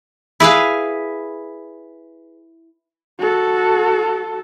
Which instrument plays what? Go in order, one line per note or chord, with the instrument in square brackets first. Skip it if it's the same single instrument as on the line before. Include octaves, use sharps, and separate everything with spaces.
[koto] E4 G#4 B4 F5
[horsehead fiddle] F#4 A4